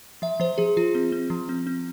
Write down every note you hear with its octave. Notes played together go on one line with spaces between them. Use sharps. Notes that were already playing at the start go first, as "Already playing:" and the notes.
F3 E5
F3 C5
F3 G#4
F3 F4
C4
C4
F3
C4
C4